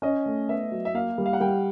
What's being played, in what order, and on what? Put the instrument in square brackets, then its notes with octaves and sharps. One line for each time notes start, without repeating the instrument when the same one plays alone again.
[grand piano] C#4 [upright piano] D#5
[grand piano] A3
[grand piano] B3 [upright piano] E5
[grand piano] F#3
[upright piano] E5
[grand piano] A#3 [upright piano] F5
[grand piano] G3
[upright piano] F5
F#5
[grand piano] G3 [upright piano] G5